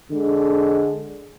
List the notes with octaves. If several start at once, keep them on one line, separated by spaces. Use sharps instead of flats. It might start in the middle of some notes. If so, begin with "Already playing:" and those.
D3 G#3